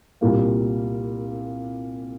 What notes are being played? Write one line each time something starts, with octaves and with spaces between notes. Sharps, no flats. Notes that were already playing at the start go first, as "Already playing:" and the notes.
C2 A#2 G3 A#3